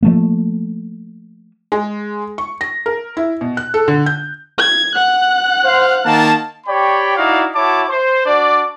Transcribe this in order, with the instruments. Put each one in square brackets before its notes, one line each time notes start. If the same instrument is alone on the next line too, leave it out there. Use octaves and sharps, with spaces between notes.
[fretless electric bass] F3 A3 A#3
[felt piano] G#3
C#6
A#6
A#4
E4
B2
F#6
A4
D3
G6
[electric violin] G#6
F#5 F#6
[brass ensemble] C5 F5
D#3 A#3 A5
[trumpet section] G4 C#5 D5 G5 B5
D#4 E4 F#4 D5 F5
E4 F#4 C#5 A5 D6
C5
D4 F#4 D5